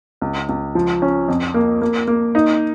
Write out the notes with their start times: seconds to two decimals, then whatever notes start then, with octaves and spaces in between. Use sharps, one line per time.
0.22 C#2
0.49 C#2
0.75 F3
1.02 C#4
1.28 F2
1.54 A#3
1.82 A#3
2.08 A#3
2.35 D#4